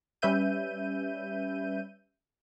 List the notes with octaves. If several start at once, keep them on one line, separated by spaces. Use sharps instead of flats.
G3 C#4 B4 E5 G6 D#7